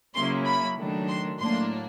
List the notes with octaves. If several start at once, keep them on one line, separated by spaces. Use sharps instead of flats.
C#3 F#3 A#3 C#4 E4 C6
B5
D#3 F#3 A3 D4
C6
A2 F#3 A#3 D4 C6